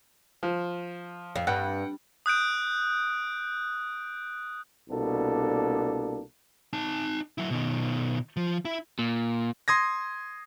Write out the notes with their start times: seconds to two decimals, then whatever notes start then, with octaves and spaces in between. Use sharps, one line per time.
0.43 F3
1.35 F2
1.47 G2 F#5 G5
2.26 D#6 F#6 G6 D7
4.90 C2 B2 A#3 D4 A4
6.73 D#4 A5
7.38 F#3 E4
7.50 B2 D#3
8.37 F3
8.65 E4
8.99 A#2
9.68 C6 D#6 G#6 A#6